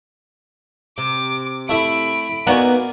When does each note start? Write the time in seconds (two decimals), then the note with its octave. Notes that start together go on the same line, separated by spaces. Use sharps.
0.98 C3 D6
1.69 A3 E4 E5 B5 D7
2.47 A#3 B3 D#4 F#4 D5 G#5